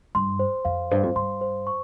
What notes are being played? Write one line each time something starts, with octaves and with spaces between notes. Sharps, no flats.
G2 C6
C5
F2 F5
G2 C5
F2
G2 C6
C5
C#6